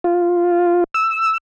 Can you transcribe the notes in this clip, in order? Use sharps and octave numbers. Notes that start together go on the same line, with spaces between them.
F4
E6